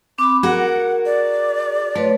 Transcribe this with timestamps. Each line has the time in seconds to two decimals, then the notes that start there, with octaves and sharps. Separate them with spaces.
0.18 C4 B5 D6
0.43 F#4 G#4 A#4 F#5
1.05 D5
1.95 A3 F4 B4 C#5